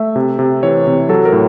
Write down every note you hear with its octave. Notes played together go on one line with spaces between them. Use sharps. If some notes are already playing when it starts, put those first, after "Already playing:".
Already playing: A3 E5
C3
C3
E3 C#5
C3
F#3 A4
A#4
A2